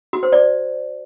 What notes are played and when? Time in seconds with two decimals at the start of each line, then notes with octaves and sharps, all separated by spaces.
0.13 F#4
0.23 C5
0.32 D5